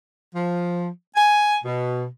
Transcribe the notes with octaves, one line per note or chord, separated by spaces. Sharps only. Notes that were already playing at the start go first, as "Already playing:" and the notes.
F3
G#5
B2